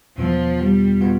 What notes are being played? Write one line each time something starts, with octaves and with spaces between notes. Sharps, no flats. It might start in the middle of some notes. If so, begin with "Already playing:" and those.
E2 B2 F3 B3 F4
G3
B2 B3 F4